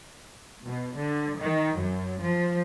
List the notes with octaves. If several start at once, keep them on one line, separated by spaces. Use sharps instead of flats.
B2
D3
D#3
F#2
F3